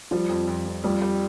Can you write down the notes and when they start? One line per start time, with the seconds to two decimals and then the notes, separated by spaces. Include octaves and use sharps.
0.11 F3 G3
0.29 F2
0.47 F2
0.66 F2
0.84 F2 G3
1.02 G3